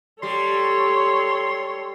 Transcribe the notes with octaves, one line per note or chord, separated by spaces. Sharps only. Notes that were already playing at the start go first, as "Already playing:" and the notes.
G3 A4 C#5 C6